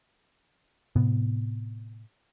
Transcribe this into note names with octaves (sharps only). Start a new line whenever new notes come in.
A2 C3 B3